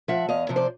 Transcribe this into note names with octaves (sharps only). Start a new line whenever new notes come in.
F3 E5 F#5
E2 D#5 F5
C3 F3
C5 D5